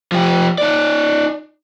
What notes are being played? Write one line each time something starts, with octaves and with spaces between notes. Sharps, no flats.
F3 G4
D#4 D5